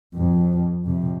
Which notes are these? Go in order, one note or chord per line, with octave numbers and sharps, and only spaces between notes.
F2
F2 C3